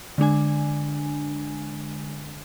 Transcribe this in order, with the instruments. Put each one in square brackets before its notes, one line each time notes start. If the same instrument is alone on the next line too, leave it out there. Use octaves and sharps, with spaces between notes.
[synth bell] D3 G#3 D4 G#5